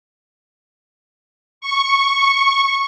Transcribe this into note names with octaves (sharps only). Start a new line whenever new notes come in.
C#6